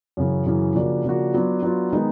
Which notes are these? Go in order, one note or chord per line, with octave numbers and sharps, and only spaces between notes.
F#2 C#3 E3
F#2 C#3 E3
C#3 F3 A#3 D4 F#4
C#3 F3 A#3 D4 F#4
F#3 B3 D4 F4
F#3 B3 D4 F4
D#3 G#3 B3 D#4